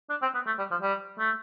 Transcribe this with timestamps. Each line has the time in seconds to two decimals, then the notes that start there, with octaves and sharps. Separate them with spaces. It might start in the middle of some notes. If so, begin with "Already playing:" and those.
0.10 D4
0.22 C4
0.34 B3
0.47 A3
0.59 G3
0.71 F3
0.82 G3
1.19 A3